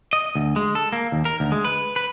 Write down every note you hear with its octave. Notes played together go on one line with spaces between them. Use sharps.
D#5
D2
G#3
A4
A#3
D#2
A#4
D2
G#3
B4
B4